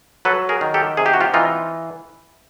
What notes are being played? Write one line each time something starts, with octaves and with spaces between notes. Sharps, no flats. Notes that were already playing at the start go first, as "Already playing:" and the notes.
F#3 A4 B4
G#4 A#4
D#3
G4 A4
C3 G#4
G4
F#4
F4 G4
E3 D#4 F4